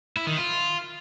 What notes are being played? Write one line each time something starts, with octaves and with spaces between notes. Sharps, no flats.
E4
D#3
F4